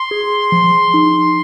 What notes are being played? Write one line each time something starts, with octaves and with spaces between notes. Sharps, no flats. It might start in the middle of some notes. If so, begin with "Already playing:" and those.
Already playing: C6
G#4
F3
D#4